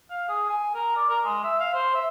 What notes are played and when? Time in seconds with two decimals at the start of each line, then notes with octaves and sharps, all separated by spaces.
0.10 F5
0.28 G#4
0.50 G#5
0.74 A#4
0.96 D5
1.09 A#4
1.24 G#3
1.44 E5
1.60 F5
1.74 C5
1.95 E5